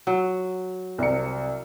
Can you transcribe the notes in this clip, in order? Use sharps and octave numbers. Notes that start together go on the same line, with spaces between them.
F#3
C2 C3 C#7